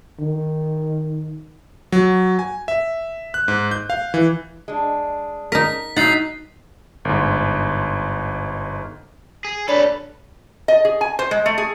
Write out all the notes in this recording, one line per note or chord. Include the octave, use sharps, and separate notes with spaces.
D#3
F#3
G#5
E5
F#6
G#2
G6
F5
E3
G#3 D4
D#4 A#4 B6
F#3 D#4 F#5 A6 C7
G1 G#2
G#4
D4 A4 B4 C#5 B5
D#5
G#4
G#5
C5
G#3
A3
G#4